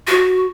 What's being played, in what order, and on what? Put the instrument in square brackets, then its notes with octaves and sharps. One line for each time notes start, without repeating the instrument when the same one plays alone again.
[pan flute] F#4